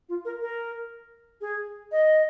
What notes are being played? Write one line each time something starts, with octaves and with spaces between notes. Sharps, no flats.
F4
A#4
A#4
G#4
D#5